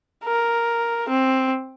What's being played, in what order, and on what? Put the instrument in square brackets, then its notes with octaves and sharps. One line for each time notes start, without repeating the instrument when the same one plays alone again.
[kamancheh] A#4
C4